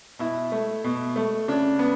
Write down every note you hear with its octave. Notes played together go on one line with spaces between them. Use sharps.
B2 E4
A3
B2
A3
C#3 D4
B3